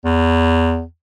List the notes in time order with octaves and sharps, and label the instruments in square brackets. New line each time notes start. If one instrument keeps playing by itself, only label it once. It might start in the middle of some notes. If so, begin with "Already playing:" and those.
[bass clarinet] E2